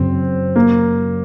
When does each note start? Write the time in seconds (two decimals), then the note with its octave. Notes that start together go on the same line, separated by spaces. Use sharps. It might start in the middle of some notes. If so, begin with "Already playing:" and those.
Already playing: F#2 C#3 F#3 C4
0.56 A#3